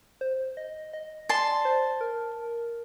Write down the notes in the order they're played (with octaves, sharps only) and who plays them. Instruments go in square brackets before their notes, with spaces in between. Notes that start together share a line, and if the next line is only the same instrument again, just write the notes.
[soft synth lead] C5
D#5
D#5
[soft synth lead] D5 [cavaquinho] A5 C6
[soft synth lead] C5
A#4